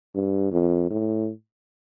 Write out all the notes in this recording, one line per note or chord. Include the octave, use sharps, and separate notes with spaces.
G2
F2
A2